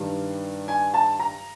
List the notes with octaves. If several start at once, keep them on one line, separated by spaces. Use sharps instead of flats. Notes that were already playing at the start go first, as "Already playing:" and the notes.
Already playing: G2 D#3 G3
G#5
A5
A#5